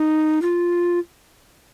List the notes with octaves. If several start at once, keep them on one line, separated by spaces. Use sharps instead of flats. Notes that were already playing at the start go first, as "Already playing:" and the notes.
Already playing: D#4
F4